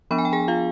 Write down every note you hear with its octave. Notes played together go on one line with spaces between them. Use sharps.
F3 B3 D4 B5
G#5
G5
G#4 G#5
F4 F5